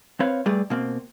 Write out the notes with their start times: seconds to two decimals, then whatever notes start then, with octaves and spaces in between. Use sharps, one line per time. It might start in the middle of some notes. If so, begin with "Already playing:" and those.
0.20 C4 B4 C#5 F5
0.46 G3 A3 G#4 B4 D5
0.70 B2 A#3 C4